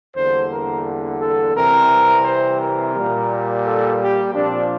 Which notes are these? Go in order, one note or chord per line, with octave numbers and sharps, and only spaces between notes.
E2 D3 G3 A#3 C5
A#4
A4
C3 E3 G3 C4 A#4
C5
A#4
A#2 G3 A#3
A4
G4
A#2 F3 C4 D4